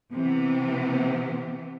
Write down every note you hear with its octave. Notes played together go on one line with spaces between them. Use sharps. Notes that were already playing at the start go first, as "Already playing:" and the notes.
C3 E3 B3